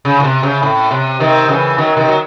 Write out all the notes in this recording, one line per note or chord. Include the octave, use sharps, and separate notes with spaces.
C#3
A2
C3
C#3
A2
C3
C3 D#3
C#3 E3
D#3 F#3
C3 D#3
F#3